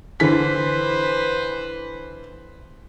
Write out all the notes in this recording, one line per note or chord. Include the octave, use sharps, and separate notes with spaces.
D3 E3 B4 C5 B6